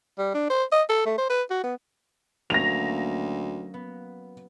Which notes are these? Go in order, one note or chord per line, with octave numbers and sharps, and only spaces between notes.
G3
D4
C5
D#5
A4
A3
C5
B4
F#4
B3
D2 F#3 A#3 C#4 A#6 F7
B3